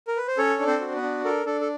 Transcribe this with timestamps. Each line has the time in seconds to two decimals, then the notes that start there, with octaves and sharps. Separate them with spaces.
0.08 A#4
0.17 B4
0.28 C5
0.38 C#4 A4 C#5
0.59 D4
0.67 C4 C5
0.81 F#4
0.95 B3 B4
1.02 D4
1.24 A4 A#4
1.45 D4 A4
1.61 A4